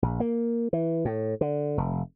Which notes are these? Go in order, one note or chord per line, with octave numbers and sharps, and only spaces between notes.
A#1
A#3
E3
A2
D3
F1